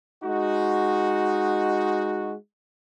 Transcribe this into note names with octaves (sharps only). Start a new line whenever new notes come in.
G#3 D#4 F#4